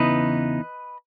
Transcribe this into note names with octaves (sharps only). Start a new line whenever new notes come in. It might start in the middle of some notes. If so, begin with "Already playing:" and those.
Already playing: E2 C#3 E3 B3 D#4 B4 D#5